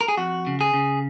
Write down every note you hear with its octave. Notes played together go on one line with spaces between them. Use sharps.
A#4
G#4
F2 F#4
C#3
G#4
C#3